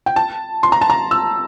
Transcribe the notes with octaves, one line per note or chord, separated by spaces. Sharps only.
G5
A5
C6
A#5
A5
A#5
E6